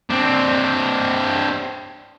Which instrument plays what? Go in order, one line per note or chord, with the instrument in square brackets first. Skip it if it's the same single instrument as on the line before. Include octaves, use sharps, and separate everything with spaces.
[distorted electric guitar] C4 D4